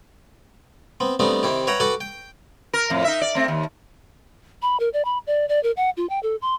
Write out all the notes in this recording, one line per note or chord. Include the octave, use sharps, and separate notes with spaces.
B3 C4
G3 A3 B3 C4 D4 D#4
C3 D#3 E4 G4
B4 C#5 E5 F#5 G5 A#5
F#4 A4 B4 F#5 G5 D6
G5
A#4
F2 A2
D#4 E5
D5
A3 C4
D#2
B5
A#4
D5
B5
D5
D5
A#4
F#5
F4
G5
A4
C6